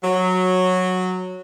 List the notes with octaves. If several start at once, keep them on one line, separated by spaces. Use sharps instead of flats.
F#3